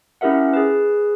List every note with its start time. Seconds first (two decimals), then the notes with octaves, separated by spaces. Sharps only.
0.21 C#4 E4 G4 A#4 E5 F#5
0.53 G#4 B4